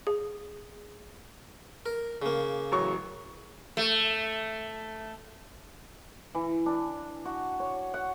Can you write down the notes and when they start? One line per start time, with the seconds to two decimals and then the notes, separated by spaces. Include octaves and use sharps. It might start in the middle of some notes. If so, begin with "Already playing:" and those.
0.07 G#4
1.86 A#4
2.22 C#3 A#3
2.72 A1 F#3 C#6
3.77 A3
6.35 E3
6.66 D4
7.25 F#4
7.60 C#5
7.94 F#5